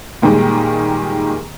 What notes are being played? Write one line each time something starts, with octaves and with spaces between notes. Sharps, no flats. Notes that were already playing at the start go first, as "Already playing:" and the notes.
A#2 D#3 G3 G#3